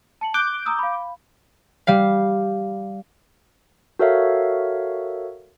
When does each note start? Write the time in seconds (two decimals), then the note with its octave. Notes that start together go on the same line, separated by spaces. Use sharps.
0.21 A5 C#7 F#7
0.34 D6 F#6 G6
0.66 A#5 D#6 E6
0.79 F5 B5
1.87 G3 F5
3.99 F#4 A4 A#4 C#5 E5 F5